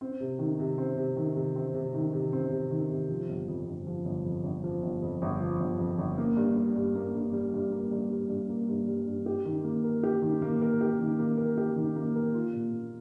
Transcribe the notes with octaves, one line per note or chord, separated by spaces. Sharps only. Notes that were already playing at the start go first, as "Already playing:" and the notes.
C4
C3
D#3
C3
C4
C3
D#3
C3
C4
C3
D#3
C3
C4
C3
D#3
C3
F3
G1
F2
G1
F3
G1
F2
G1
F3
G1
F2
G1
F3
G1
F2
G1
A#3
G2
G3
G2
A#3
G2
G3
G2
A#3
G2
G3
G2
A#3
G2
G3
G2
G4
D#3
A#3
A#4
G4
D#3
A#3
A#4
G4
D#3
A#3
A#4
G4
D#3
A#3
A#4
F4
A#2
A#3